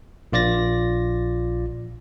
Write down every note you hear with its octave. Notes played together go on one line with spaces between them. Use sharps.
A#1 F4 D5 A6 A#6